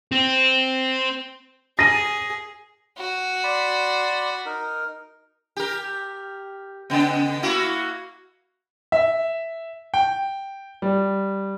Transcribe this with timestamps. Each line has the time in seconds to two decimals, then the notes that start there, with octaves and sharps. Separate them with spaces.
0.12 C4
1.79 G#4 A#6 D#7
2.97 F#4
3.44 D5 B5 C6
4.46 D#4 A#4
5.57 G4 A#4
6.90 C#3 B3
7.42 A#3 E4 F#4
8.92 E5
9.94 G5
10.82 G3